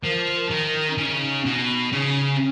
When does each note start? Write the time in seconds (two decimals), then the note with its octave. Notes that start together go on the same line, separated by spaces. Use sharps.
0.03 F3 A#4
0.50 D#3 A#4
0.90 C#4
0.98 C#3 D#4
1.45 B2
1.92 C#3 C#4